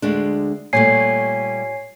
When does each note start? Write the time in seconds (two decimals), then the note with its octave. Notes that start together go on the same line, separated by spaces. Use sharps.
0.02 D2 G#3 D4
0.73 A#2 G3 A3 C#5 G#5 C7